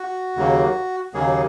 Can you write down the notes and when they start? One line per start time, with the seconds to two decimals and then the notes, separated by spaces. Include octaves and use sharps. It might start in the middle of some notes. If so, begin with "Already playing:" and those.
Already playing: F#4
0.36 D#2 C#3 F#3 A#3
1.14 D#2 C#3 F#3 A#3 G#4